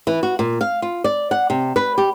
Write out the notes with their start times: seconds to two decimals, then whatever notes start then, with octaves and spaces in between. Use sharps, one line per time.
0.07 E3
0.23 F#4
0.39 A#2
0.61 F5
0.82 F4
1.04 D5
1.31 F#5
1.50 C3
1.76 B4
1.98 G4